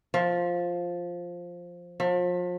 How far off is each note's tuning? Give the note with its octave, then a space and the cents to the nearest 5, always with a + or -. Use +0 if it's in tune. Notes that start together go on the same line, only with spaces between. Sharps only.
F3 +5
F3 +35